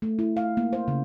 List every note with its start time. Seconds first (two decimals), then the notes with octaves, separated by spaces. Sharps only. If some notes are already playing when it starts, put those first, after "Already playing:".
0.02 A3
0.19 E4
0.37 F5
0.57 A#3
0.73 C5
0.88 C#3